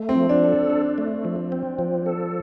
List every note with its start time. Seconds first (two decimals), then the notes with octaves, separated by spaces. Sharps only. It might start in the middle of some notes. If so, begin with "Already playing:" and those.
Already playing: A3
0.09 C4
0.16 F3
0.29 D4
0.43 A4
0.70 D4
0.98 A3
1.25 F3
1.52 C4
1.79 F3
2.06 A4